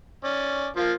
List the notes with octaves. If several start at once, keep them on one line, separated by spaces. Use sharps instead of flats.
C#4 D5
F3 A#3 F4